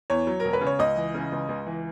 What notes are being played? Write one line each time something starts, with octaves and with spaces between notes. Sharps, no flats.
E2 C#5
F#3
E1 A#4
B4
C#3
C#5
C#2 D#5
E3
C#3
C#2
C#2
E3